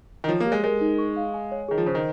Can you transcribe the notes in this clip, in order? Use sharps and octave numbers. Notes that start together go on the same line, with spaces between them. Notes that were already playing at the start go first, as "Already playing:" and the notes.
D#3
F3 C#5
A#3
G4
G#3
G#3 A#4
D#4
C#6
F5
G#5
C#5
D#3 G#4
F3
C#3 C5
D#3